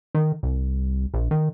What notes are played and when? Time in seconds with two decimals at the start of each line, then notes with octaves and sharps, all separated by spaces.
0.15 D#3
0.43 C2
1.14 A#1
1.31 D#3